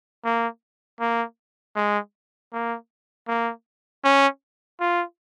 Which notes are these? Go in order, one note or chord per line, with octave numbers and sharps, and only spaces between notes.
A#3
A#3
G#3
A#3
A#3
C#4
F4